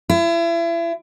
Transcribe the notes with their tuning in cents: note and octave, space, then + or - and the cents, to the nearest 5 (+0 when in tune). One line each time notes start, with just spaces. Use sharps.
E4 +35